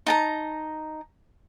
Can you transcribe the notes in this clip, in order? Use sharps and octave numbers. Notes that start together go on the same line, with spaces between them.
D#4 A5 A#5